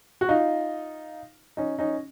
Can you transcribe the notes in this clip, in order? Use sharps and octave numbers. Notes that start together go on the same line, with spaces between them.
F#4
D#4 F4
C#4 D#4
C#4 D#4